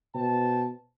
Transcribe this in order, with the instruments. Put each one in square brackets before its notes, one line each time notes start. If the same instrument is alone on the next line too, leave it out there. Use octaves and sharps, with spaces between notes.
[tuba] B2 [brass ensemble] C5 G5 A5